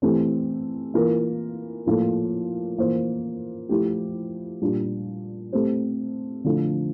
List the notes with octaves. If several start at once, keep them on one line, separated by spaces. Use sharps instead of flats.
E3 A3 C4 G4
E3 A#3 F4 A#4
A2 F3 A#3 F4 A4
E3 A#3 F4 C5
F3 A3 E4 G4
A#2 G3 D4 F4
A3 C4 G4 C5
D3 F3 A3